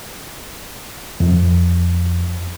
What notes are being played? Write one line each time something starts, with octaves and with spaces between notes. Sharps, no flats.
F2